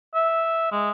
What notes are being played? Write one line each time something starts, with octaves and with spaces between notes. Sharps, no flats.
E5
G#3